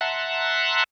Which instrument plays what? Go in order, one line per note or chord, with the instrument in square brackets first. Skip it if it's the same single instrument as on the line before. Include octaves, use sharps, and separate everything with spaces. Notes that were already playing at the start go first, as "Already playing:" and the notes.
[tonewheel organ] E5 F#5 A5 A#5 C6 F#6